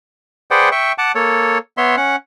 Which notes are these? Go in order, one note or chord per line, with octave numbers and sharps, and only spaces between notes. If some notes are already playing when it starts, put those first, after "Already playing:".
G#4 B4 C5 D5 F#5 G5
E5 G5 C#6
F#5 A5 D6
A#3 A4 C#5
B3 C#5 E5 C6
C#4 F#5